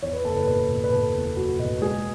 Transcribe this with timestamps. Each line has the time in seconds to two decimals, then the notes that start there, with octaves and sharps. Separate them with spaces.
0.02 E2 C#5
0.13 B4
0.24 F#1 A4
0.36 B4
0.47 B2 B4
0.70 B2
0.84 B4
0.92 B2 A4
1.14 E2
1.37 F#3 F#4
1.59 B2 F#4
1.82 G#3 G#4